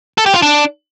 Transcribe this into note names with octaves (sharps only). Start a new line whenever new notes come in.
A4
G4
F4
D4